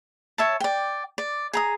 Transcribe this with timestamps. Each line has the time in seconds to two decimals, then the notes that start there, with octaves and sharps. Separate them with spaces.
0.38 C#5 E5 A5
0.60 D5 G5
1.18 D5
1.53 G#4 A#5 D#6